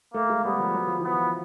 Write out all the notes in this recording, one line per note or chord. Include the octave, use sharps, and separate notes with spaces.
A3 A#3
G#3
G3 B3
F3
F#3
F3
E3 B3
F3